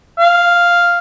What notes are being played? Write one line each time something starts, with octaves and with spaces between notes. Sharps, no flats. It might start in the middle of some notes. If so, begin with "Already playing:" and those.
F5